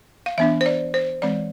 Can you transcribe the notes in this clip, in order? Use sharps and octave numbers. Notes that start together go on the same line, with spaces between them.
F5
E3 B3 D4 E5
C5
D5
C5
E3 G#3 C4 D5